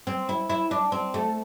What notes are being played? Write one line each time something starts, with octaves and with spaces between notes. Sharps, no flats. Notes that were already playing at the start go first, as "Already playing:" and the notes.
C4
E4
E4
D4
C4
A3